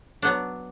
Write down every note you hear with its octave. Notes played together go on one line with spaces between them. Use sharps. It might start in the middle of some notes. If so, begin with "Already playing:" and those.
F#3 B3 D4